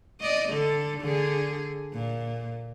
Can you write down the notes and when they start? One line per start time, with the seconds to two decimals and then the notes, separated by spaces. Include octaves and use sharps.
0.21 D5 D#5
0.49 D3 A4
1.01 D3 G#4
1.94 A#2